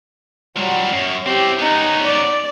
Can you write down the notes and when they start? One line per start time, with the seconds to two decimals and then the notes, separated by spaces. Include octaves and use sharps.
0.56 A#2 F#3 G3
0.93 F#2 C#4
1.26 C4 E4 G4
1.59 B3 C#4 D#4
2.04 D5